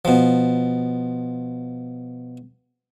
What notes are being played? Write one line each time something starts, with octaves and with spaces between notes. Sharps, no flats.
B2 F3